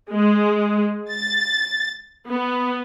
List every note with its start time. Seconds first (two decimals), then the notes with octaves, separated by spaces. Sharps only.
0.11 G#3
1.10 A6
2.29 B3